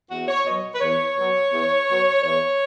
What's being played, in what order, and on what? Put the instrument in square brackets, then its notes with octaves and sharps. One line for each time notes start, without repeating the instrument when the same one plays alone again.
[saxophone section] E2 F#4
C#5
B2 F#3 D#5
B4
E2 C#5
B2 F#3
E2
B2 F#3
E2 C#5